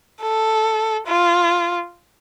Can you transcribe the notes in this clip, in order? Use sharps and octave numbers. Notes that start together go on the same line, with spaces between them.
A4
F4